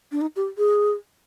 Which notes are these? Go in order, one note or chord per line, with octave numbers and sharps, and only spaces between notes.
D4
D#4
G4
G#4